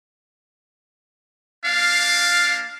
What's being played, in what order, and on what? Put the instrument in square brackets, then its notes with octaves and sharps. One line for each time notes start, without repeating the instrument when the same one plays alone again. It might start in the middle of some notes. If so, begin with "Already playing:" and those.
[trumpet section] A#3 D4 F5